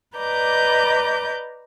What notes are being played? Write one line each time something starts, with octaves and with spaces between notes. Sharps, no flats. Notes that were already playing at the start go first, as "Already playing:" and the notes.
B4 D5 D#5 A#5 D6 G6